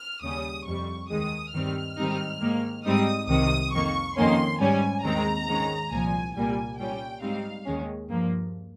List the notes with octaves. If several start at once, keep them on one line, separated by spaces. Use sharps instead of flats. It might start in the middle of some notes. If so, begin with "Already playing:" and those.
Already playing: F6
D#2 C#3 G3 C#4 D#6
F2 C3 G3 C#6
D#2 D#3 G#3 D#6
G2 D#3 G3 C4 F6
G#2 D#3 G3 C4 D#4
G#2 D#3 A#3
G#2 G3 C4 D#4 D#6
C2 C3 D#3 D#6
F2 D#3 A#3 C#6
F2 D#3 A#3 C#4 C6
G#2 G3 C#4 G#5
D#2 D#3 G#3 C4 A#5
G#2 D#3 G#3 C#4
C2 A#2 F3 G#5
C2 A#2 G3 A#3 G#5
A#2 G3 C#4 G5
G#2 G3 C4 D#4 F5
D#2 D#3 G#3 C#4
G2 F3 A#3